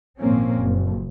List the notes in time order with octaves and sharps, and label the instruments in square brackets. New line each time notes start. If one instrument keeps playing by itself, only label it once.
[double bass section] G#1 A#2 F3 A#3 C4 C#4
F#1